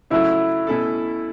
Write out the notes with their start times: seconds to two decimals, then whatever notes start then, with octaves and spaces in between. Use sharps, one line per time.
0.10 C#3 F#3 A3 E4 E5
0.67 B2 A3 C#4 E4 A4